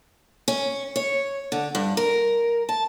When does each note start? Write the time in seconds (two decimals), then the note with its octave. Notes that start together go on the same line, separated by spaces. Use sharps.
0.48 C#4
0.96 C#5
1.52 D3
1.75 G2
1.97 A#4
2.69 A5